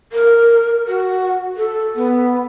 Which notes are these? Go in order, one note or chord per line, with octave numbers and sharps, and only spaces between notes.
A#4
F#4
A4
B3